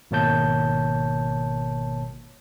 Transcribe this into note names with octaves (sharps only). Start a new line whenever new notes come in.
G#1 B2 A#3 C#5 A5 G6